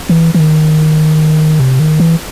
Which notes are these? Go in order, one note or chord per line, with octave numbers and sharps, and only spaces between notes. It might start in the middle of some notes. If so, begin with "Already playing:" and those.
E3
E3
D#3
C3
D#3
E3